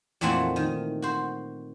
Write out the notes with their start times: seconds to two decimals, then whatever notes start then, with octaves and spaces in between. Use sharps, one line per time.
0.21 F2 A#2 E3 A3 C4 F#5
0.56 D#3
1.02 F#4 C5